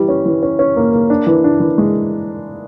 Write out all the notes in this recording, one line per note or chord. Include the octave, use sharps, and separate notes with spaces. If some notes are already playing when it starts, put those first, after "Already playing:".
Already playing: E3 G3
C#4
E3
C#4
C#4
A#3
A#3
D4
E3
D4
E3
G#3